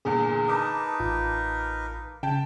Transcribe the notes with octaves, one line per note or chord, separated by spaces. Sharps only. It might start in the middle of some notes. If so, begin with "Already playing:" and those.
E2 A#2 D3 G#4
D#4 A#4 B4 A5 D6 D#6
A1 F4
C#3 G5 A5